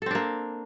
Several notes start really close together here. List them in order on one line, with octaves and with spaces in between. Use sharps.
A4 C4 D4 A#3